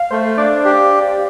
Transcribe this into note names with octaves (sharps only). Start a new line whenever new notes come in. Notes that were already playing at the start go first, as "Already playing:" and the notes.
Already playing: F5
A3 C5
D4 D5
G4